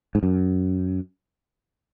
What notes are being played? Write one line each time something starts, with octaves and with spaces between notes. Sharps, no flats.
G#2
F#2